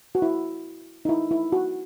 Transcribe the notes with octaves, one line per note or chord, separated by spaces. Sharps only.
F#4
E4
D#4
E4
E4
F#4